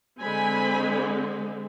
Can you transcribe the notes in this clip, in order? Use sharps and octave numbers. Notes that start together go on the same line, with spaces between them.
D3 G#3 C4 G#5 B5